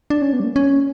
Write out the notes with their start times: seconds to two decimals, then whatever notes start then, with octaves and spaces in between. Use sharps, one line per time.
0.10 D4
0.22 C#4
0.33 B3
0.40 G3
0.44 A#3
0.56 C#4